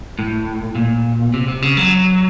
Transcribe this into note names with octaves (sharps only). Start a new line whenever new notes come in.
A2
A#2
C3
C3
C#3
F#3